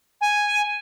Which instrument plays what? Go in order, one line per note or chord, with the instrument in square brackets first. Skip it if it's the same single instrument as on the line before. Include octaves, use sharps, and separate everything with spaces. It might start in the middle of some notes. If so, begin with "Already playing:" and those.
[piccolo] G#5